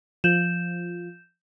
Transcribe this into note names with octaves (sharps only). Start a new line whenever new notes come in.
F3 G6 E7